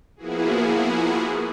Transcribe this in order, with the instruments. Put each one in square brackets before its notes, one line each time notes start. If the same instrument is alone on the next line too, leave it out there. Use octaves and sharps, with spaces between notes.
[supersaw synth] F3 A#3 B3 E4 F#4 G#4